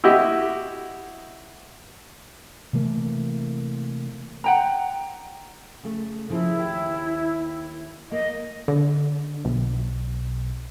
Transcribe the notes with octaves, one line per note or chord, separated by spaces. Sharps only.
E4 F#4 G4 D#5
C3 E3 A3 A#3
F#5 G5 A#5
C#3 A3
C#3 F3 A#3 E4
D#2 G4
A#3 D#5
D3
B1